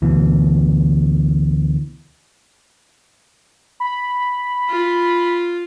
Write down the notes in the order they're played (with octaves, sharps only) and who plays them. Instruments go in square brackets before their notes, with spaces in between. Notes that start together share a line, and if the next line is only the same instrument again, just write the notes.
[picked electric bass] D2 B2 E3
[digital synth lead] B5
[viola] F4